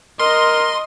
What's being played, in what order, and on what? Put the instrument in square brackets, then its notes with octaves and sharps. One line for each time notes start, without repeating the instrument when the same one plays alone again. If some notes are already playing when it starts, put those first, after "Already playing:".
[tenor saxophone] A#4 [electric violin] D#5 [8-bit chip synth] C6